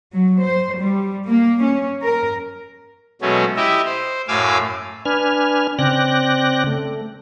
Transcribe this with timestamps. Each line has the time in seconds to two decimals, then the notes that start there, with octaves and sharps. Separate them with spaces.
0.13 F#3
0.42 C5
0.78 G3
1.27 A#3
1.62 C#4
2.03 A#4
3.22 B2 F#3 G#3 A3 C#4
3.57 E4 G4 D#5 E5
3.86 C5
4.28 F#2 A2 F5 G#5 D6 E6
5.05 D4 B4 G#5 F6
5.79 C#3 C4 D5 G5 F#6 A#6
6.67 A3